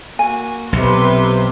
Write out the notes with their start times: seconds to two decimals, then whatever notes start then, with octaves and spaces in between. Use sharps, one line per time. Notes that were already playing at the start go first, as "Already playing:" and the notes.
0.19 A#3 F#4 G#5
0.73 B1 C3 B4 C6